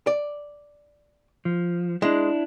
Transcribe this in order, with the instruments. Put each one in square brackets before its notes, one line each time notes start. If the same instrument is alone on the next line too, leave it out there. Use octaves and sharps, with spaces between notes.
[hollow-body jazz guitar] D5
[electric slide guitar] F3
[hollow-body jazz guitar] G#3 [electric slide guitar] D4 E4